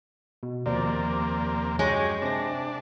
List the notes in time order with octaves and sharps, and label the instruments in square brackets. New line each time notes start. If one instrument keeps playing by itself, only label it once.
[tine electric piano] B2
[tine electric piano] D#2 F3 [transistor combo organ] C3 A#3 [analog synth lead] D5
[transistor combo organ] F#2 G4 [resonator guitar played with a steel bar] G#3 [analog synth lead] C#5
[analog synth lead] C3 [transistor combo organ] D4 [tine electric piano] A5 A#6